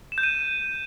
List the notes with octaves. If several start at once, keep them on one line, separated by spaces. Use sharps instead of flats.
E7
G6
D#7